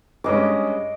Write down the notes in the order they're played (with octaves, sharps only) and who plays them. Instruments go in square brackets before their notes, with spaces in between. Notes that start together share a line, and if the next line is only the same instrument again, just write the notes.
[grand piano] G2 G#3 C#4 [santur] D#5 D6